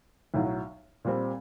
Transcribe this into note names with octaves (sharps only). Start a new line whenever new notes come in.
B1 A2 F#3
A#2 G3 C4